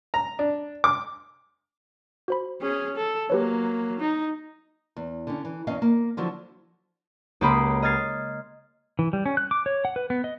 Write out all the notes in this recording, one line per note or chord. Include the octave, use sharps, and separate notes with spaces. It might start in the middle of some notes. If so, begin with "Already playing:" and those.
A#5
D4
D6
F#4 C5 B5
C#4 G#4
A4
F#3 A#3 G4 B4 C#5
D#4
E2
D3 C#4
E3
E2 C#4 D#5 F5
A#3
D3 F3 F#3 E4
C#2 A#3 G4 B5 C6 D#6
D#5 F6 G#6 A6 C7
E3
G3
C#4
F#6
D6
C#5
F#5
B4
B3
D#5